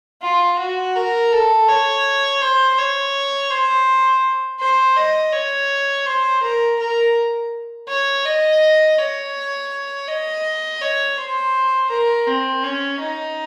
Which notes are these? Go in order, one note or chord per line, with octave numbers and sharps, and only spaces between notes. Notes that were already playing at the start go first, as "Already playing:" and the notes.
F4
F#4
A#4
A4
C#5
C5
C#5
C5
C5
D#5
C#5
C5
A#4
A#4
C#5
D#5
C#5
D#5
C#5
C5
A#4
C4
C#4
D#4